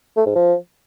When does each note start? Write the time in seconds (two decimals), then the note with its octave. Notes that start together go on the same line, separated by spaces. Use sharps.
0.17 A3
0.26 G#2
0.35 F3